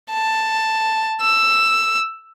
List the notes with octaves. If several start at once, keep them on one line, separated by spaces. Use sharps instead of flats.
A5
E6